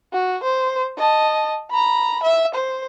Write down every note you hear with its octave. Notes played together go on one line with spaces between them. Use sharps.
F#4
C5
D#5 A5
A#5 B5
E5
C5